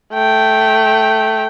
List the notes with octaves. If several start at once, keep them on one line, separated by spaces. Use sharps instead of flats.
A3 G5